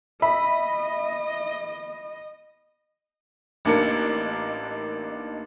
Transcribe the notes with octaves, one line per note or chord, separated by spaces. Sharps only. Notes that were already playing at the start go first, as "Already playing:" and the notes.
D#5 E5 B5
A1 A#3 D4 D#4 A#4 C#7